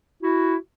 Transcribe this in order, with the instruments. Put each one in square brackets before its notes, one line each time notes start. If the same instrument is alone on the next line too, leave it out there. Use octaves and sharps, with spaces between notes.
[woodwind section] E4 F#4